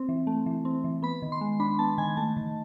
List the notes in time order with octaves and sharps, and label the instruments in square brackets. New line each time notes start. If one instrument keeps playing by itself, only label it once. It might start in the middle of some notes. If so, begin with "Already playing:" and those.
Already playing: [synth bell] C4
E3
A3
E3
C4
E3
B3 B5
D#3
C6
G#3
D4 B5
B3 A5
D#3 G#5
A3 A5
D#3